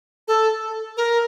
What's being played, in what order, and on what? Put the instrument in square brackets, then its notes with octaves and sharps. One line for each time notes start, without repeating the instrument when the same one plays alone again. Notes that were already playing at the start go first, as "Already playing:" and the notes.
[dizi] A4
A#4